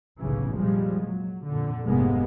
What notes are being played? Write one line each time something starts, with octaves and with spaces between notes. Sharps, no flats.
F1 B1 A2 C#3 E3
A#2 F3 G3 G#3
F#3
F2 A#2 D3
F1 G#2 C3 G#3 A#3 B3